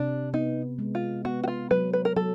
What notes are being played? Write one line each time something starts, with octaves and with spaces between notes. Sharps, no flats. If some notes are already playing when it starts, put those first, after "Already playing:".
Already playing: C3 D4
B3 D#4
G#3
F4
B3 F#4
F#4
F4
F#3 B4
B4
A#4
F#3 A4